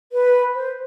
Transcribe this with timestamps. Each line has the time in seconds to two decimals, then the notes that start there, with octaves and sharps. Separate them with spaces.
0.12 B4
0.55 C5